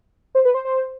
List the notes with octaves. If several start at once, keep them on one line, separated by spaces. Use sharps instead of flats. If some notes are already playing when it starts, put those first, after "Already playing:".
C5
B4
C5
C5